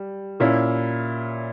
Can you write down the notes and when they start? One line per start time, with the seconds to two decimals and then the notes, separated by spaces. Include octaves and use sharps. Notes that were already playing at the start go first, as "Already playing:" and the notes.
Already playing: G3
0.40 A#2 A#3 C#4 E4